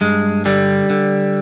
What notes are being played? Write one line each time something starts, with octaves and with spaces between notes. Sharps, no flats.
G2 G#3
D3 G3
D3